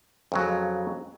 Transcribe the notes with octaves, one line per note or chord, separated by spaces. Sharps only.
F2 C#3 F#3